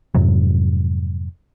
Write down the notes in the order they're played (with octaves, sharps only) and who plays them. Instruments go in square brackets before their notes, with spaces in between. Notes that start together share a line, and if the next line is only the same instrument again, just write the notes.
[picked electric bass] F2 G#2 C3 F#3